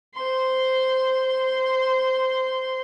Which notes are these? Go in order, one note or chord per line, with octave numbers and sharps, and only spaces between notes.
C5 C6